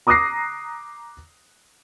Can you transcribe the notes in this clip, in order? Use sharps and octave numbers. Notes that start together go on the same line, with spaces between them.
A#5 D6 D#6 F#6 A#6 C7